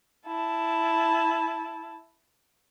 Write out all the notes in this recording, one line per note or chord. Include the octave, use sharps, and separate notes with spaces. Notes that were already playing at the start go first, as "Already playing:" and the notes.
E4 A5